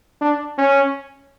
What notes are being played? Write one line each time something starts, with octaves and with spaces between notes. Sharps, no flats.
D4
C#4